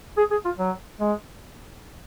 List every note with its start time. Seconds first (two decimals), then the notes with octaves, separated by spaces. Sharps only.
0.18 G#4
0.31 G#4
0.45 F4
0.59 F#3
1.00 G#3